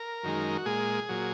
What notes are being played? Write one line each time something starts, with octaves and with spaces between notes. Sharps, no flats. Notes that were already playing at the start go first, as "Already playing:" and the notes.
Already playing: A#4
F#2 D#3 G#3
F#4
A#2 G#3 G#4
A#2 F#3